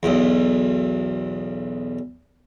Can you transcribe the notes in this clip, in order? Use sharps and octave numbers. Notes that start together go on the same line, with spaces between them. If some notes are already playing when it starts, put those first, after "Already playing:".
B1 E2